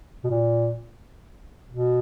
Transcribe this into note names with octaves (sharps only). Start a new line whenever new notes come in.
B2
A#2
B2